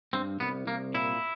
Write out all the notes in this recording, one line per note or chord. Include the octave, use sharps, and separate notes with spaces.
G2 C4
C2 B3
C2 A#3
A#2 E4